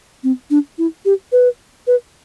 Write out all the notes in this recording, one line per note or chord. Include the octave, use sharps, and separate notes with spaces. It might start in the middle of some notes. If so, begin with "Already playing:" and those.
C4
D4
E4
G4
B4
B4